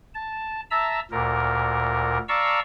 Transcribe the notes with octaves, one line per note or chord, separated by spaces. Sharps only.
A5
E5 A5 A#5 E6
D2 A#2 A#4
D5 F5 A5 A#5 C#6 E6